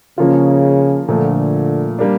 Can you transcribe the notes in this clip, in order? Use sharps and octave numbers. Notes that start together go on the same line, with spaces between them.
C#3 F3 A#3 C#4 F4
A#2 D3 F3 A3
G3 A#3 D4